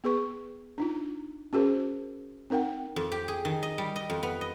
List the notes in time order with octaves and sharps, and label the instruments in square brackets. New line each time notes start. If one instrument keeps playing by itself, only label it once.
[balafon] B3 G#4 B4 C#6
D4 D#4 F4
C#4 F#4 G#4 A#4 C5
C4 D#4 A#4 F#5 G5
[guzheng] F2
G4
G#4
D#3
D#5
G3
D#5
F2
B3
D#5